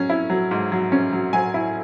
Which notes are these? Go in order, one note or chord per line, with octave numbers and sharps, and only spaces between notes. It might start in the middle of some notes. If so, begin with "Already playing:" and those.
Already playing: F#3 C#4
E4
F#3
G#2
F#3
C#4
F#3
F#3 G#5
E4